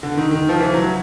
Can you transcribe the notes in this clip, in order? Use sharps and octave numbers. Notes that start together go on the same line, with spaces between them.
D3
D#3
D#3
F3
E3
F#3